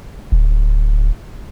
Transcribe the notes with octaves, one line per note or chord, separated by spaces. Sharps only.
D1